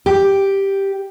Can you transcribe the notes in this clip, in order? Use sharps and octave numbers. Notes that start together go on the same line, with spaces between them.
G4